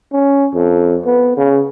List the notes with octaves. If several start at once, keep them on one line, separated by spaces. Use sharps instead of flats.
C#4
F2
B3
C#3